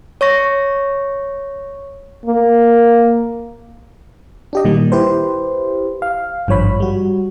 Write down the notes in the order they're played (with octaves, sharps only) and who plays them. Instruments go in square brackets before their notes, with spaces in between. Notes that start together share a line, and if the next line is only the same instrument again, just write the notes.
[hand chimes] C#5 C#6 A#6
[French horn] A#3
[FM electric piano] D4 G4 D#5
A#2 D#3 G3
E4 G4 B4 C5
F5
G#1 G2 F3 C#5 B5
G3 F#4